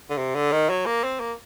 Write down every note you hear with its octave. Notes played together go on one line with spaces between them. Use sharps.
D3
C3
D3
D#3
F#3
A#3
C4
A#3